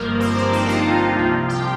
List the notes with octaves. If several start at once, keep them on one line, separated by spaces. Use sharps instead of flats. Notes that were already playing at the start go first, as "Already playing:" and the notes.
Already playing: G1 G2 F3 A#3 A#4
C4 C5
D4 D5
D#4 D#5
F4 F5
C2 C3 F3
G4 G5